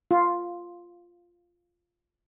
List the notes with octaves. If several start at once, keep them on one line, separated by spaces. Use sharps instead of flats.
F4